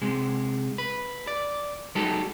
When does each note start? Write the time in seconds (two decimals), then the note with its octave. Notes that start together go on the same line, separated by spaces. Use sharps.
0.02 C3 G#3
0.78 B4
1.27 D5
1.95 F#3 G#3 D#4 G4 A4